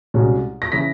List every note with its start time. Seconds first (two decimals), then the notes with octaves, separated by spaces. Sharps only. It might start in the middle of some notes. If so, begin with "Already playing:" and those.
0.14 C2 B2 G#3 C#4
0.62 A#6
0.72 C#3 E3 B6